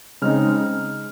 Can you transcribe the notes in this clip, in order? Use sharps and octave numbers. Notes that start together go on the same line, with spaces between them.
C#3 G#3 C4 D#4 F6